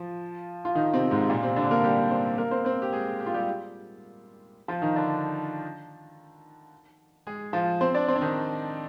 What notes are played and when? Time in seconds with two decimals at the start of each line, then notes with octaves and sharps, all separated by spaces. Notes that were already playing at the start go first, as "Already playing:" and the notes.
Already playing: F3 F4
0.65 F4
0.75 D#3 D#4
0.94 C3 C4
1.11 G#2 G#3
1.29 A#2 A#3
1.43 C3 C4
1.56 D3 D4
1.71 A#3 A#4
1.84 G3 G4
2.11 C4 C5
2.38 A#3 A#4
2.51 C4 C5
2.65 C4 C5
2.82 G4
2.92 G#3 G#4
3.20 G4
3.26 F4
3.34 G3 G4
4.68 F3 F4
4.82 D#3 D#4
4.96 D3 D4
7.27 G#3 G#4
7.53 F3 F4
7.81 C4 C5
7.94 D4 D5
8.08 C4 C5
8.16 D4
8.21 D#3 D#4